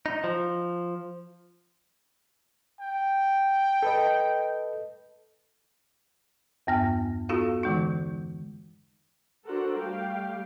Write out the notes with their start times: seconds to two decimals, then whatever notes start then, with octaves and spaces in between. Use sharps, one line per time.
0.06 D#4
0.24 F3
2.80 G5
3.83 A4 B4 D#5
6.67 E2 G2 B3 G#5 F6
7.29 B3 D#4 F4 F#4 A4 F5
7.64 D3 E3 G#3 D#4
9.46 D4 F#4 A4 A#4 C5 F#5
9.77 G3 A3 G4 F5 G5